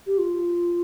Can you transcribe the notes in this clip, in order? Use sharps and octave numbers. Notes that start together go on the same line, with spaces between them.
G4
F4